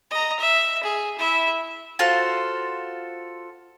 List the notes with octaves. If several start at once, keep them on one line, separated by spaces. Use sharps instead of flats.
D#5 A#5
E5
G#4
E4 E5
F4 F#4 A4 C5